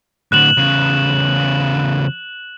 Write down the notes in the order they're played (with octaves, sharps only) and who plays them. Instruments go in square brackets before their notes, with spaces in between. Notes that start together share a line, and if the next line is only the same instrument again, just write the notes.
[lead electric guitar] A2 D3 [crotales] F#6 E7 F#7
[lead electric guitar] E2 C#3